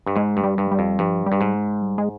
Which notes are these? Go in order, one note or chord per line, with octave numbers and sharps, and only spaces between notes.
G2
G#2 G#3
G2
G3
G2
G3
F2
G2 F3
G3
G2
G#2
G#3
G3
G#3